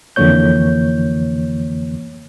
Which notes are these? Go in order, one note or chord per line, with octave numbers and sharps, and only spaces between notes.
F2 D3 E3 A#3 C#5 G6